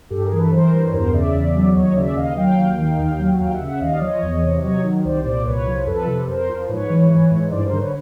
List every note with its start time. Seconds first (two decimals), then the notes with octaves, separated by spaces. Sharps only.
0.10 G2 G4 A4
0.24 G#4 A#4
0.32 E3
0.38 A4 B4
0.52 E3 A#4 C5
0.73 G2
0.87 C#5
0.93 E2 A#4 C5
1.14 C#3 D5 E5
1.34 E2
1.55 F#3
1.75 D#2 C#5 D#5
1.96 C#3 D5 E5
2.16 D#2 D#5 F5
2.37 F#3 F5 G5
2.58 D#2
2.78 D#3
2.99 D#2
3.20 F#3
3.40 D#2 F5 G5
3.54 E5 F#5
3.61 C#3
3.67 E5 F#5
3.81 D#2 D#5 F5
3.93 D5
4.01 F3 C#5 D#5
4.22 E2
4.43 C3
4.63 F#3 C#5 D#5
4.83 D#3
5.05 C2 C5 D5
5.25 A#2 C5 D5
5.45 C2 B4 C#5
5.66 F3
5.86 F2 A4 B4
6.07 C3
6.27 F2 A#4 C5
6.49 F3
6.69 G#2 B4 C#5
6.90 E3
7.10 E3
7.31 G#2
7.51 G2 C5 D5
7.65 A#4 C5
7.73 D3
7.79 B4 C#5